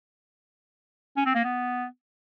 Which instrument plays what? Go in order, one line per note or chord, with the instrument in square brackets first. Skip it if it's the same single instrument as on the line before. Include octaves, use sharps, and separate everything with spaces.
[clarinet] C#4
C4
A#3
B3